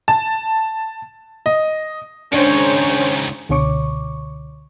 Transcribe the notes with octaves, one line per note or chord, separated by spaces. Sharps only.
A5
D#5
C#2 D#3 G#3 C#4 D4 C5 C#5
C#2 B2 D3 C#5 C#6 D6